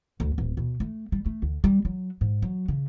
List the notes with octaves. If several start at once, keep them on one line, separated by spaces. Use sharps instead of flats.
D2
D1
B2
A3
G3
A3
D2
G3
F#3
G#2
F#3
C#3